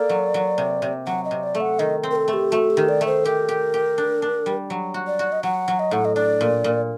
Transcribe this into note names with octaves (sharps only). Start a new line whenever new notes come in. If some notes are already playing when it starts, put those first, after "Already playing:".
Already playing: A#3 A4 D5
F#3
F#3
C3
C3
F#3 F#5
D#5
C3
D5
A3
F#5
D#3 D#5
C4
A#4
A4
A3
G4
A3 F#4
G4
D#3
D5
A3
C5
G4 A#4
G4
G4
D4
D4
G3
F#3
F#4
D5
F#4
D#5
F#3 F#5
F#3
D#5
A2 F#5
D#5
D4 D5
A#2
A#2